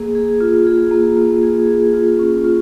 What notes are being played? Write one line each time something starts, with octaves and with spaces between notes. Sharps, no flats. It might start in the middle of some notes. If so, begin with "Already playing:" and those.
Already playing: A#3 G#4
G#4
F4
G#4
A#3
F4
G#4
G#4
F4
C#4
F4